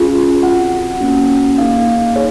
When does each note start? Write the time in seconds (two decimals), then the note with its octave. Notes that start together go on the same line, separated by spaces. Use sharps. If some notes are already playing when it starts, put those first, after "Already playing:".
Already playing: C#4 F4 G#4
0.43 C4 F#4 F#5
1.00 A#3 C#4 F#4
1.58 A#3 D#4 G#4 F5
2.16 G#4 C#5